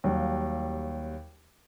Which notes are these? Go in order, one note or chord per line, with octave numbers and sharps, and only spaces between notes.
D#2 F#3 G3 F5